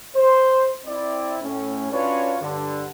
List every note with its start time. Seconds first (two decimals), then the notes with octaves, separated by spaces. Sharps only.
0.16 C5
0.86 C4 E4 D5
1.42 A2 C#4
1.92 C#4 D4 F4 F#4 B4 C#5
2.42 G2 D3